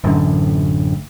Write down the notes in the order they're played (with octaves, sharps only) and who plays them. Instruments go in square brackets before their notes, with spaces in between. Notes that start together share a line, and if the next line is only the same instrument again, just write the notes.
[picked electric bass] A1 F#2 D3